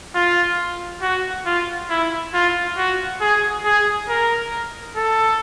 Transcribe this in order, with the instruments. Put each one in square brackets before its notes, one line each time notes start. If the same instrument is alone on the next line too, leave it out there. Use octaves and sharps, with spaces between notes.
[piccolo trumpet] F4
F#4
F4
E4
F4
F#4
G#4
G#4
A#4
A4